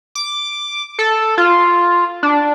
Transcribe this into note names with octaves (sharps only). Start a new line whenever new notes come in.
D6
A4
F4
D4